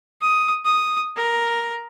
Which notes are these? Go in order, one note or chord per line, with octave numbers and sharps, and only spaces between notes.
D#6
D#6
A#4